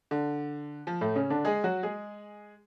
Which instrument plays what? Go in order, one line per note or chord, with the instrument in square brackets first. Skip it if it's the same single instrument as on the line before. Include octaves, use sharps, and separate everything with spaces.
[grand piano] D3
F3
A2 A3
C#3 C#4
D3 D4
G#3 G#4
F#3 F#4
G#3 G#4